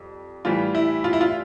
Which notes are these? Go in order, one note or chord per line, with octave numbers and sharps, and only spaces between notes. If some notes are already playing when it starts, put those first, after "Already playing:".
Already playing: F2 G3
A2 E3 G3 F4
E4
F4
E4
F4